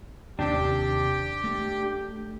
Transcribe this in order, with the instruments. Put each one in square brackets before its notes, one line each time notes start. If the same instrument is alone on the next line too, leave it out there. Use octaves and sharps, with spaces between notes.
[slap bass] D#2 C3 [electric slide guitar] D4 [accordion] G4 G5
[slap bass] A3